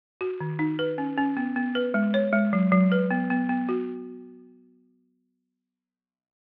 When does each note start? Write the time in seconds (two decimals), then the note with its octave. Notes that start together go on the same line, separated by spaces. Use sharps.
0.21 F#4
0.40 D#3
0.59 D#4
0.79 B4
0.98 C#4
1.18 C#4
1.37 B3
1.56 B3
1.75 B4
1.94 G#3
2.14 C#5
2.33 G#3
2.53 F#3
2.72 F#3
2.92 B4
3.11 B3
3.30 B3
3.49 B3
3.69 F#4